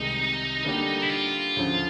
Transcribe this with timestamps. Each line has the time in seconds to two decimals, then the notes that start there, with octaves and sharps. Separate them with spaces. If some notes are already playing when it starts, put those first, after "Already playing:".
Already playing: C2 C3 D#3 G#3 D#4
0.65 D3 G3 A#3 D4 G4
1.02 E4
1.10 F4
1.57 D2 C#3 F3